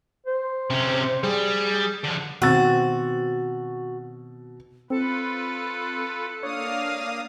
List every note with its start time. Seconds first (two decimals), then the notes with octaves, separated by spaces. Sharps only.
0.26 C5
0.70 C3 C#4
1.23 G3 G#4
2.04 D3 F3
2.42 B2 D#3 B3 C4 F#4 E6 A6
4.90 C4 F4 A4 B4
6.43 A#3 D4 C#5 F5 D#6